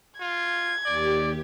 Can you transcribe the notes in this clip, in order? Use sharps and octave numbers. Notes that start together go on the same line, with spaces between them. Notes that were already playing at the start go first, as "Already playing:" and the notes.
F4 G#6
D#2 G4 D5